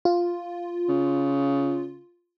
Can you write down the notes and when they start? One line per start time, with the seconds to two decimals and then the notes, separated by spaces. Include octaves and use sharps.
0.05 F4
0.88 C#3